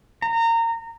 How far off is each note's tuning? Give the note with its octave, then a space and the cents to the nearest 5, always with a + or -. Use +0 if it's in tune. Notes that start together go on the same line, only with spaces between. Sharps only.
A#5 -25